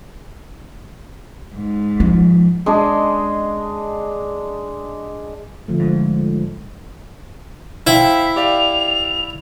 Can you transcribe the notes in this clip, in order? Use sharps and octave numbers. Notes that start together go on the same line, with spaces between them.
G#2
F3
G#3 D4 D#5
D3 F3 A3
G#2
E4 C5 F5 G5 B6
G4 D5 F5 F7